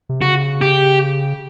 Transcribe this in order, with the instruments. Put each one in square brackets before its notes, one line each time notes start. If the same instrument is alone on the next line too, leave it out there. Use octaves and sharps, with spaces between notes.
[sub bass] C3
[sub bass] C#3 [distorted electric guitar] F#4
[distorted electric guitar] G4